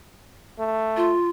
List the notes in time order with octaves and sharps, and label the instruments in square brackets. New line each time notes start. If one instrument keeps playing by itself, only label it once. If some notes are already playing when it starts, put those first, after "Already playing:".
[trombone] A3
[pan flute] F4